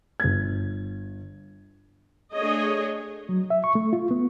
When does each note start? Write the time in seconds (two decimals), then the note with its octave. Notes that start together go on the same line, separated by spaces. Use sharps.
0.20 G1 G#6
2.34 A3 D4 G#4 C#5 D#5
3.29 F#3
3.50 E5
3.64 C#6
3.75 A3
3.93 F4
4.11 B3